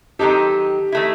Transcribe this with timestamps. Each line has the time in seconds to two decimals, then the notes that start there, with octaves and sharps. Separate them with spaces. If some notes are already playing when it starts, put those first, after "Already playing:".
0.19 D#3 F#3 C4 D#4 G4 A4
0.92 D#3 A3 E4